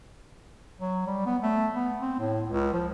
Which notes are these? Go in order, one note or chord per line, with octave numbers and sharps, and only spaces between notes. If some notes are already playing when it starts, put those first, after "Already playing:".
F#3
G3
B3
A3
B3
C4
A2
C#2
F3